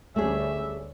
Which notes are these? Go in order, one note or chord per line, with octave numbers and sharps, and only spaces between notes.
D2 G3 A3 C#4 G#4 E5